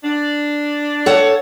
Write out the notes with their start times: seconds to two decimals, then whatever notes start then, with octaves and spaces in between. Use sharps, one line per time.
0.04 D4
1.06 A4 C#5 F#5